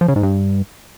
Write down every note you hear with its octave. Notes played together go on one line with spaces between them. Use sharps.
F3
C#3
G#2
G2